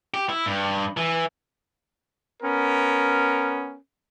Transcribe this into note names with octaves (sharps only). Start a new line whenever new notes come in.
G4
E4
G2
E3
B3 C#4 A#4